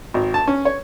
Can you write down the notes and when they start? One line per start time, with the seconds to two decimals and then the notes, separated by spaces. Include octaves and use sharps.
0.14 G#1
0.34 A5
0.47 C#4
0.65 C#5